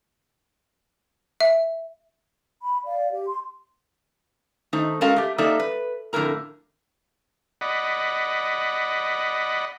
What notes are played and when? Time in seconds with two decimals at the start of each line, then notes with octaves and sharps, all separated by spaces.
1.40 E5
2.62 B5
2.86 D5 F5
3.12 G4
3.27 C6
4.73 D#3 A3 D#4 C5
5.01 G#3 C#4 F#4 A4 A#4 F5
5.16 A3 G4
5.38 G3 A#3 D#4 A4 D5 E5
5.60 B4
6.13 F2 A2 D3 E4 A#4 A#5
7.61 D5 D#5 F#5 B5